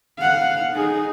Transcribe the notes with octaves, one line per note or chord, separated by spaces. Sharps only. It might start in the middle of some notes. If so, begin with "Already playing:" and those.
F5 F#5
D#4 G#4